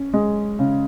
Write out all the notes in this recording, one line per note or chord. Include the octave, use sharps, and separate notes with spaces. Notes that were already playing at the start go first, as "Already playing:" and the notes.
Already playing: C#4
G#3
C#3